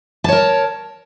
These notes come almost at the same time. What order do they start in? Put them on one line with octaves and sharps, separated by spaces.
A5 C#5 A#4